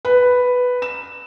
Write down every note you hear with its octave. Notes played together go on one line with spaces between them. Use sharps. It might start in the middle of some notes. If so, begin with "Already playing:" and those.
B4
E7